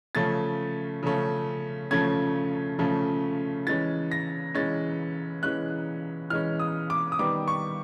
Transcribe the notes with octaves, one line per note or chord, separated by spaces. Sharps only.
C#3 F3 A3 C#4 A6
C#3 F3 A3 C#4
C#3 F3 A3 C#4 G#6
C#3 F3 A3 C#4
E3 G#3 C#4 A6
A#6
E3 G#3 C#4 A6
E3 G#3 C#4 F#6
E3 G#3 C#4 F6
D#6
D6
D#6
D#3 G3 B3 D6
C#6